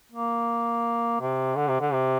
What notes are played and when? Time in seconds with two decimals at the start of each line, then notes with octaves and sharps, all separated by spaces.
0.12 A#3
1.21 C3
1.56 D3
1.68 C3
1.80 D3
1.93 C3